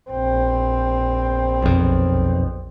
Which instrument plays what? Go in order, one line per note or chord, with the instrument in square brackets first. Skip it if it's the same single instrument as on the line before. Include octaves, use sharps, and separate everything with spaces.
[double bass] A#1 C4
[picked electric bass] B1 F2